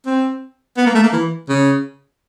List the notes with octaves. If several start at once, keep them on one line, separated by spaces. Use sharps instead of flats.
C4
B3
A#3
A3
A#3
E3
C#3